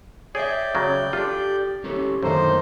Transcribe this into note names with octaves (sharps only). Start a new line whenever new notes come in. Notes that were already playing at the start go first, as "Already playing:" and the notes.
G#4 C#5 D5 E5 G5
C#3 F#3
D4 F4 G4 A4
C#4 G4 A4
F#2 A2 D3 D#3 A#3 D#4 C5